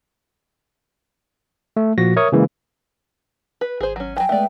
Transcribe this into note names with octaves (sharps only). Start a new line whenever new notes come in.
A3
A#2 F3 F#4 A#6
A#4 C#5 E5 C#6 D#6
C#3 E3 G#3 A#3
B4
G#1 G#4 C5
F#3 C#4
E3 F#3 G5 G#5
G#3 A3 B3 D5 E5